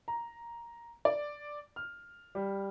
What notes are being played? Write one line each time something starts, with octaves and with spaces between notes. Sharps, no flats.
A#5
D5
F6
G3